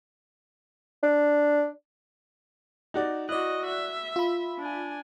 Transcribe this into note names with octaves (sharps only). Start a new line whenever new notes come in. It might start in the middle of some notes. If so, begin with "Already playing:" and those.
D4
D#4 F#4 D5
E4 F#4 D5 D#5 F#6
E5
F4 B5
D4 G#5